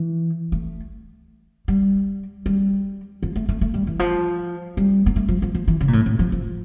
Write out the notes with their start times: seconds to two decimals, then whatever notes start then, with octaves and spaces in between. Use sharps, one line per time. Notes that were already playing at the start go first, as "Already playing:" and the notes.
Already playing: E3
0.52 A3
1.68 G3
2.46 G3
3.23 F3
3.36 A3
3.49 A3
3.61 A3
3.74 G3
3.87 E3
3.99 F3
4.77 G3
5.06 A#3
5.16 A3
5.29 F3
5.42 F3
5.55 F3
5.68 E3
5.81 C#3
5.88 A#2
5.93 A2
6.06 A2
6.19 F3
6.32 F3